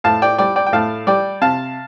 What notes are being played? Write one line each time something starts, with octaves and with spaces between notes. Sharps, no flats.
A2 F5 A5
D5 G5
G3 D5 G5
D5 G5
G5
A2 F5 A5
G3 D5 G5
C3 F5 A5